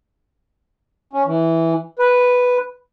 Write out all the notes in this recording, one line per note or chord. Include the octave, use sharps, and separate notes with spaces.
C#4
E3
B4